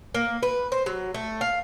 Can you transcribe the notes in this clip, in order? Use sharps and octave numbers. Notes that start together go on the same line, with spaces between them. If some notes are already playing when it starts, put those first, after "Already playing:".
A#3
B4
C5
F#3
A3
F5